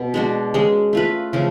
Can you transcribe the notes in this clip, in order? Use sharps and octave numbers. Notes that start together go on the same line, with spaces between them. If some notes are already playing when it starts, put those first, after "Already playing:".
Already playing: B2
G#3 D4 F#4
G#3 C#4 G#4
A3 F4 B4
C#3 F3 A3 C#4